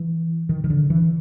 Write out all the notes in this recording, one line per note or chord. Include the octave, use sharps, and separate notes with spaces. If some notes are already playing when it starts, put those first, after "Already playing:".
Already playing: E3
D#3
D#3
D3
E3